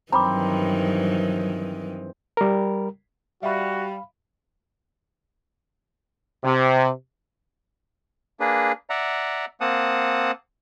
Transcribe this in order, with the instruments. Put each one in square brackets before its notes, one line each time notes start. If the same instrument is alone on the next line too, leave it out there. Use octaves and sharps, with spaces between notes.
[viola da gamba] G2 D#3 E3 [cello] F#3 [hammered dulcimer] C4 [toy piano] A#5 B5 D6
[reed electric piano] G3 A#4
[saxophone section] G3 [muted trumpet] F#4 [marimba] E5 [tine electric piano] F5 B5
[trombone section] C3
[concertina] A#3 D4 G#4 B4
D5 E5 F#5 A#5
A#3 C4 F#5 A5 D#6